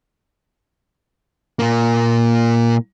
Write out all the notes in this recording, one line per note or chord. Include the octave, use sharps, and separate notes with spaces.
A#2 A#3